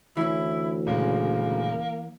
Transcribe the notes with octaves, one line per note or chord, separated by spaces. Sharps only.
D2 E3 C#4 E4
D#1 C#3 G#3 A#3